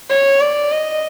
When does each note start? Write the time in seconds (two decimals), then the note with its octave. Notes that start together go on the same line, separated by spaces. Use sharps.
0.10 C#5
0.40 D5
0.71 D#5